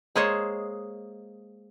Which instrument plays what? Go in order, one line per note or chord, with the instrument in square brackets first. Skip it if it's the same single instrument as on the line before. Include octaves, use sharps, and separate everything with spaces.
[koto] G#3 A#3 G#4 C5 C#5 D#5